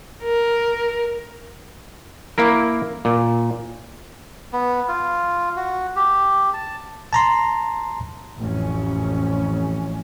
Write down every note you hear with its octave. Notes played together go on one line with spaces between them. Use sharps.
A#4
A#3 E4 A#4
A#2
B3
F4
F#4
G4
A5
A5 A#5 C6
A1 F2 C#4